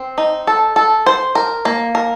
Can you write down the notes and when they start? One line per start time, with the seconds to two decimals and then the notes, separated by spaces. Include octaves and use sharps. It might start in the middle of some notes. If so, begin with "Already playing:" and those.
Already playing: C4
0.18 D#4
0.47 A4
0.76 A4
1.06 C5
1.35 A#4
1.65 A#3
1.95 A#4